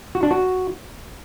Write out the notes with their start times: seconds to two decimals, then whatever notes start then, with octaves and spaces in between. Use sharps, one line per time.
0.15 F#4
0.23 D4
0.31 F#4